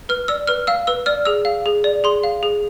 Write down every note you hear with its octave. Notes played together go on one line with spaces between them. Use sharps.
B4 F6
D5 E6
B4 F6
F5 E6
B4 E6
D5 F6
G#4 E6
F5
G#4
D5
G#4 C6
F5
G#4